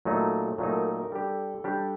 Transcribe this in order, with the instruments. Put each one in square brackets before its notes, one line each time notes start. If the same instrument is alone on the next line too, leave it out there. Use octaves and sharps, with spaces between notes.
[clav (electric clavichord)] A#2 F#3 A3 D#4 [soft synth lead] A4
[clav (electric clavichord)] A#2 F#3 A3 D#4 [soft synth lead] A4
[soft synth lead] A#4
A4
A#4
[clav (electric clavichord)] G3 D4 G4 [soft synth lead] A4
[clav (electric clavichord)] G3 D4 G4